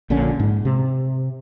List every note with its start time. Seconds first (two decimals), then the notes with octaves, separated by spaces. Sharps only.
0.10 A#1 A#2 D3 C#4
0.40 G#2
0.65 C3